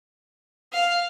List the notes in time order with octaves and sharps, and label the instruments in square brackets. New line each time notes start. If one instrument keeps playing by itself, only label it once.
[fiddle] F5